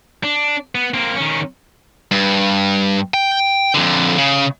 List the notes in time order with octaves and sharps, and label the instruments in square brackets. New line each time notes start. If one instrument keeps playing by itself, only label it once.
[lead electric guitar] D4
B3
A#3 C4
D#3 C#4
[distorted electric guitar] G2
G5
F2 D3
C#3